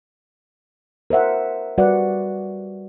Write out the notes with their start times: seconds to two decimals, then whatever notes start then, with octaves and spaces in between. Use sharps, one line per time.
1.10 A#4 C5 E5 F#5
1.78 G3 F#4 B4 D5 F#5